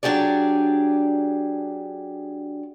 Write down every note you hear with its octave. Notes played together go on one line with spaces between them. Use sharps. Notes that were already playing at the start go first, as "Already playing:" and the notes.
F#3 D4 G4 G#4 D5